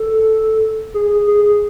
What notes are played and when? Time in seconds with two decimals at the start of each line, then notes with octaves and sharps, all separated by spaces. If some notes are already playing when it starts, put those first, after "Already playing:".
Already playing: A4
0.94 G#4
1.27 G#4